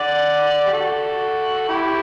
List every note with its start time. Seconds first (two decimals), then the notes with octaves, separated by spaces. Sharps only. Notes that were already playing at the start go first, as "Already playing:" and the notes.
Already playing: D5 F#5
0.67 G4
0.73 F#4 A4
1.69 E4 G4